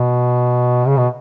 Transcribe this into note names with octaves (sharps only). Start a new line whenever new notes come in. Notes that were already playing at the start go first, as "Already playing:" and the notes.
Already playing: B2
C#3
B2